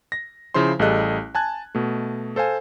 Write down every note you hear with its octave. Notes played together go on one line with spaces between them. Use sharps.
A#6
C#3 F3 E4 C5 C6
A1 G3 G#4 A4 D#5 F#6
G#5 A5 F#6 G#6
B2 A3
A4 C5 F5 G#5